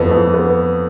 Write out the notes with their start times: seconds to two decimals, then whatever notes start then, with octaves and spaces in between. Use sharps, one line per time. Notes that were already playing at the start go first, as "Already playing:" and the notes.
Already playing: F2 E3 B3 A4
0.11 F2
0.34 B3